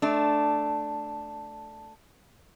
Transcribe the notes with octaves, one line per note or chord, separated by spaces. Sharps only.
A3 D4